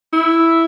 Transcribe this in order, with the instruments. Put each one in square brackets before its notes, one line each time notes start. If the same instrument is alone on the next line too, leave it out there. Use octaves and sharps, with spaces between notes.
[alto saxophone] E4